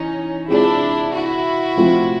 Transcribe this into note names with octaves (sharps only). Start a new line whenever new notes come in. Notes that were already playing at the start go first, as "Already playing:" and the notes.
Already playing: E3 C#4 D#4
G#3 C4 D4 E4 F4 G#4
E4 F#4
F3 A3 C4 F4